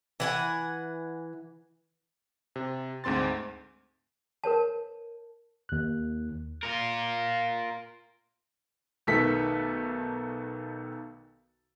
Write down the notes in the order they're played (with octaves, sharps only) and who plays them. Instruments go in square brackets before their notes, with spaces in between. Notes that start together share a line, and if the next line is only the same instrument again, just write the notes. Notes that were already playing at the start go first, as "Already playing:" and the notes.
[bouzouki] E3 F#5 G#5
[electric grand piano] C3
D2 G#2 C4 C6 A6
[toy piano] A#4 B4 C#5 A5
[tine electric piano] D#2 F#6
[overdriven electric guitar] F4 A#4
[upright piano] B1 D#3 A3 B3 A4 B6